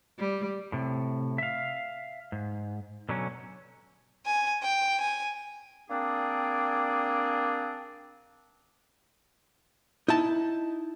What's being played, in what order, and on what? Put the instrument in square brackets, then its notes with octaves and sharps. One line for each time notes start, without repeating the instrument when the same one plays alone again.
[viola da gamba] G3
[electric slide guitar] A2 C3
E5 F5
G#2
B2 D3 F#3 C#4
[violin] G#5
G5
G#5
[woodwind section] A#3 C4 D4 G#4 D5 G5
[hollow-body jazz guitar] D#4 E4 A5